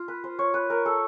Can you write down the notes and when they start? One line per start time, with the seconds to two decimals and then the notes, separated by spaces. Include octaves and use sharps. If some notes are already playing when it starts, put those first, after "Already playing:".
Already playing: F4
0.08 B4
0.24 C5
0.39 C#5
0.54 B4
0.70 A#4
0.86 A4